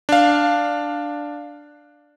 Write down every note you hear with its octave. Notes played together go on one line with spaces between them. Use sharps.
D4 F5